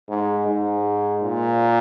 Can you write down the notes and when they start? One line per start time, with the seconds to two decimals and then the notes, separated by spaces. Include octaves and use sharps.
0.09 G#2
0.47 G#2
1.23 A#2